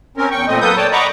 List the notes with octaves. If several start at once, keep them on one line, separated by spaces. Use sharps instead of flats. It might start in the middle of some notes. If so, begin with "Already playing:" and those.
C4 C#4 A#4
E2 G5 C#6
A#2 A3 C4 D#5
F#3 A#3 A4 B4 D#6 G6
C#5 D5 G5 A5
D#5 F#5 A#5 B5 C#6 D6